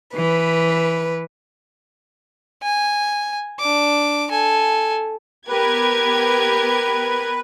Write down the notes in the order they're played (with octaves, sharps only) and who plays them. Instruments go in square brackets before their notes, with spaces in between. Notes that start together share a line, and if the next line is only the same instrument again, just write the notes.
[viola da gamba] E3 [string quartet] B4
[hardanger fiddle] G#5
D4 D6
A4 G#5
[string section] B3 G4 G#6 [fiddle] A#4 [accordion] B4